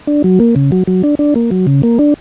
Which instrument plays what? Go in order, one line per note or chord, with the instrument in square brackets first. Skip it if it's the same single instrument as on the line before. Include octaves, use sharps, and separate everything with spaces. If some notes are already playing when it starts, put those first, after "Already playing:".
[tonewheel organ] D4
F#3
A#3
C#3
F#3
F#3
D4
D4
A#3
F#3
C#3
A#3
D4